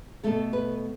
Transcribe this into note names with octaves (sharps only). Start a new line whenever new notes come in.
B2 A3 A4
B4